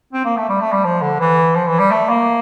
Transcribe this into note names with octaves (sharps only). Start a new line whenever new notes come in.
C4
A#3
A3
G3
A3
G3
F3
D3
E3
F3
E3
G3
A3
A#3